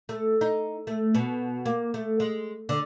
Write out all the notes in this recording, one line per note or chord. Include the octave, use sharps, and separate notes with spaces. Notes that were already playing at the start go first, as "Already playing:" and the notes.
A3
D#4
A3
B2
A#3
A3
G#3
D3